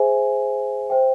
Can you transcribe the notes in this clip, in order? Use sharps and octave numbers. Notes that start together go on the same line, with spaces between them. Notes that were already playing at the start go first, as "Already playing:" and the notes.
Already playing: G#4 C5 E5 G#5
C5 E5 G5